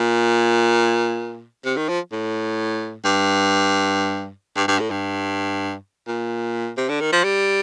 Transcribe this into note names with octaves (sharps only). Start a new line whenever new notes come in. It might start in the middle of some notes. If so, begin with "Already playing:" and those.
Already playing: A#2
C3
D#3
F3
A2
G2
G2
G2
A2
G2
A#2
C3
D3
D#3
F3
G3